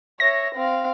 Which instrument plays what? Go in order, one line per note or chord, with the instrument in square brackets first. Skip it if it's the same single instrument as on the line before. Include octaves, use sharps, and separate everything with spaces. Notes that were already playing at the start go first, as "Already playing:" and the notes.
[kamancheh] C#5 E5 [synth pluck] A#6
[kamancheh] C4 F5